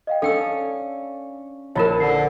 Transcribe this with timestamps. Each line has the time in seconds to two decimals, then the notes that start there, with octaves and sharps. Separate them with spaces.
0.07 D#5 F5 G5
0.22 C#4 D4 A4 F5 G5 E6
1.75 A#1 E4 F4 A#4 C#5 B5 A6 E7
2.00 D3 C7